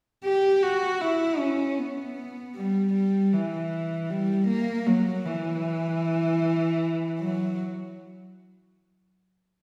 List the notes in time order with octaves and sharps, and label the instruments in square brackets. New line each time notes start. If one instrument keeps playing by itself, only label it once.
[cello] G4
F#4
E4
C#4
B3
G3
G3
E3
G3
A#3
F#3
E3
F#3